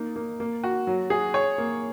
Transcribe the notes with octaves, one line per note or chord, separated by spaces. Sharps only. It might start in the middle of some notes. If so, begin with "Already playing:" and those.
Already playing: A#3 D#4
A#3
A#3
F#4
F#3
G#4
C#5
A#3